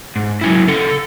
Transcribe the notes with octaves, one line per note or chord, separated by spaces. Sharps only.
G#2
F#3 C#4 E4
C#3 A4